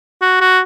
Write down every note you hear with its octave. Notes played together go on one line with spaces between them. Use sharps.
F#4
F#4